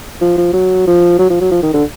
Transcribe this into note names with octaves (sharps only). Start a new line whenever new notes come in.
F3
F3
F#3
F3
F#3
F3
F#3
F3
D#3
D3